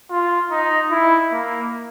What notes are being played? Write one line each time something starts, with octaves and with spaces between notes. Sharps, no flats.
F4
D#4
E4
A#3